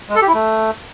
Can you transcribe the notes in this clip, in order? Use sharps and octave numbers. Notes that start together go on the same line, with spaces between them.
G#3
A4
G4
E4
A3